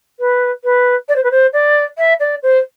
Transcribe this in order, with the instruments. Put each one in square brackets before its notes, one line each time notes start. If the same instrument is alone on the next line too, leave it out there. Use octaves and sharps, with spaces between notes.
[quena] B4
B4
D5
C5
B4
C5
D5
E5
D5
C5